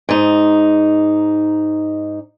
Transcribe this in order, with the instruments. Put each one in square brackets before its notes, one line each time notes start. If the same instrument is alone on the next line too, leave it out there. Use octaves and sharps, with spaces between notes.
[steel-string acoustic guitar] G#2 D#4